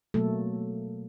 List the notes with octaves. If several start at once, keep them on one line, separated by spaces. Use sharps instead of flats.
B2 F#3 A3 A#3 A4